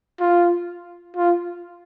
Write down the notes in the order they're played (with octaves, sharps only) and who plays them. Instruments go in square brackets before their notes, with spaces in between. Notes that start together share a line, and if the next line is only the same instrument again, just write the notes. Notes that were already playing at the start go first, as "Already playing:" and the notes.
[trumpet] F4
F4